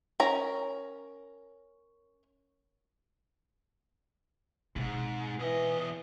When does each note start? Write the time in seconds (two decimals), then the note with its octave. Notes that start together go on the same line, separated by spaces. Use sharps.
0.20 C#4 A#4 A#5
4.76 E2 G#2 B2 C4
5.39 E2 E3 D#5